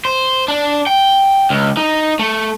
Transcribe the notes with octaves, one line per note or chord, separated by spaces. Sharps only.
C5
D4
G5
C#2
D#4
A3